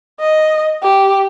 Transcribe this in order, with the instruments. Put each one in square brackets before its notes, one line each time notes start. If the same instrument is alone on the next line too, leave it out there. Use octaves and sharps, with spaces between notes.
[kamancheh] D#5
G4